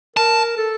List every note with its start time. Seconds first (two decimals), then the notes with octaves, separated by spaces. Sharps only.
0.16 A#4 A5
0.58 A4